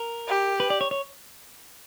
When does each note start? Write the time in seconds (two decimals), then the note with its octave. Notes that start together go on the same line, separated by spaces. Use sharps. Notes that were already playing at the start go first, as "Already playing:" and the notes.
Already playing: A#4
0.28 G4
0.60 B4
0.70 D5
0.81 C#5
0.91 C#5